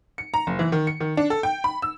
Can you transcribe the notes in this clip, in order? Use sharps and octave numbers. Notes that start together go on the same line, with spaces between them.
C#7
A#5
F#1
E3
D#3
C#7
D#3
D4
A4
G5
B5
E6